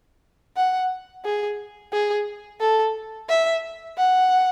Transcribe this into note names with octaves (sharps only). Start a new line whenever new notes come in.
F#5
G#4
G#4
A4
E5
F#5